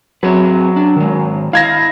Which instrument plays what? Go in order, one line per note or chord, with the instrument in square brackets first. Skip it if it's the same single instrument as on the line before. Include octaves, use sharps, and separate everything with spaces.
[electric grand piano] F#3 [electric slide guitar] C4 G#4 B4
[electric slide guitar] D4
D#3 G#3
[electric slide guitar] E4 D#5 [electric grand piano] F5 G#6 A#6